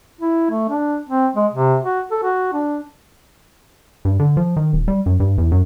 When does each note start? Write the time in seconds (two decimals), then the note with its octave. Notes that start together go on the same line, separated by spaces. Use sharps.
0.21 E4
0.50 A3
0.69 D4
1.09 C4
1.36 G#3
1.53 C3
1.84 F#4
2.11 A4
2.23 F#4
2.53 D4
4.05 G2
4.19 D3
4.37 F3
4.56 D#3
4.73 D#1
4.88 G3
5.06 F#2
5.20 G2
5.38 E2
5.51 F#2